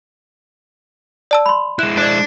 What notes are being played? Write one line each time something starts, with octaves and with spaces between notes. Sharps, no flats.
D5 A5 E6
B5 C6
G#3 E4 F#6
D4 C5 D5